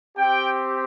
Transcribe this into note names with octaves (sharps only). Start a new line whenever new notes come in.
C4 G4 G5